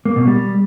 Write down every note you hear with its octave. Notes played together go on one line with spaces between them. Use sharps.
A#3
B2
G3